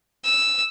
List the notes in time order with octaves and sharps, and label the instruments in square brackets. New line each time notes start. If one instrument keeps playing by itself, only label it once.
[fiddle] E6